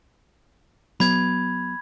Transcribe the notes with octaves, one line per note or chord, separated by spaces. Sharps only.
F#3 B3 B5 G#6